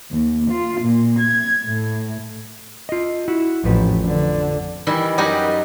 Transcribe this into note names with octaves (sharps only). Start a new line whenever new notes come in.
D#2
F4
A#2
G#6
A2
F4 D#5
E4 F#4
A1 F2 F3 B4
D3
D#3 E3 G3 E4
F#2 G3 D#4 G4 F#5 G#5